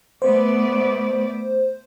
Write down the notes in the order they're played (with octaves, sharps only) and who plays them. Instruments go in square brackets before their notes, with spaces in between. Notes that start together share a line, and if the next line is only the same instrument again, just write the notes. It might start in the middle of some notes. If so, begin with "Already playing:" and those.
[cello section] A3 B3 D5 [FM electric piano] C5